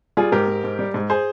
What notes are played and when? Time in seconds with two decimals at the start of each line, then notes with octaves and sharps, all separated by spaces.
0.17 G3 F4 G#4
0.32 G#2 G4 A#4
0.48 G#2
0.64 G#2
0.79 G3
0.94 G#2
1.10 G#4 C5